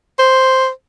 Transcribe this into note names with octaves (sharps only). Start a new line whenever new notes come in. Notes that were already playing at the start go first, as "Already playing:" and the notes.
C5